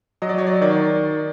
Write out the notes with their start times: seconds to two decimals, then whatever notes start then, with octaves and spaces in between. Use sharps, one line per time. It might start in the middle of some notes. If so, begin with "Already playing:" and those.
0.22 F#3 D#5
0.29 D5
0.38 C#5
0.47 D5
0.61 D#3 D5